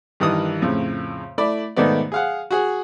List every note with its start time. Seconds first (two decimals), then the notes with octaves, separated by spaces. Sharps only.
0.20 G2 D#3 E3 D#6
0.62 F2 A2 C#3
1.38 A3 E4 D5 B5
1.77 G#2 B2 D#3 A3 B3 D5
2.12 G#4 F5 F#5
2.51 F#4 G#4